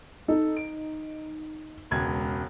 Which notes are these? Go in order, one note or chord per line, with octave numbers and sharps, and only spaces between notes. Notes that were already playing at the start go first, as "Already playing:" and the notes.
D#4 A4
D7
E1 C#2 G#6